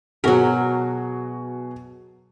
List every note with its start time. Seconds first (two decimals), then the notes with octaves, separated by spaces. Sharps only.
0.24 B2 F#3 F#4 G#4 A#4